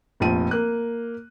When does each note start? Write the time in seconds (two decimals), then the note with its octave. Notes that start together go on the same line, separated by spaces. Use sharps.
0.20 F1 A#1 F3 D#7
0.51 A#3 F#6